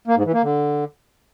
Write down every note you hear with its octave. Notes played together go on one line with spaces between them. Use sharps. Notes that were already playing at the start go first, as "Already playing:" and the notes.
A#3
G#2
E3
A#3
D3